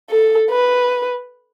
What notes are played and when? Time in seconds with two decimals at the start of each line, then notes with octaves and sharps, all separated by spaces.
0.10 A4
0.50 B4